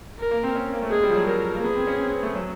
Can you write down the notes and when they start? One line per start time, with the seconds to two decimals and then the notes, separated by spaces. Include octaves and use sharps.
0.19 A#4
0.31 A#3
0.43 C4
0.55 C#4
0.73 A#3
0.82 A3
0.91 G#3 G#4
1.03 G3
1.10 F3
1.16 F#3
1.27 F#3 A#4
1.54 A#3
1.64 B3 G#4
1.75 C4
1.87 C#4
2.00 C4
2.11 B3
2.23 A3
2.35 F#3